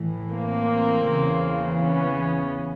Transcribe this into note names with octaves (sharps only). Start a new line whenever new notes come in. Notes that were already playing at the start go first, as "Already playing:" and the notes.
Already playing: A2 E3
A#3 C4
E2 C#3 E3
B3 C#4